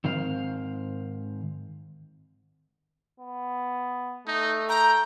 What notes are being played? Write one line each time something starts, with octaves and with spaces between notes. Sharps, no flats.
G#2 D#3 C4 F5
B3
A3 D#4
G5 A#5